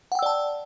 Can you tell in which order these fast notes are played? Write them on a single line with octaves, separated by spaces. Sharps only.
F#5 G5 E6 D5 A5